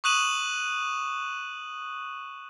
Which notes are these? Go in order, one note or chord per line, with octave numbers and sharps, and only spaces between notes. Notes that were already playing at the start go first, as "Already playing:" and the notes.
C#6 D#6 F#6 D#7 E7 F#7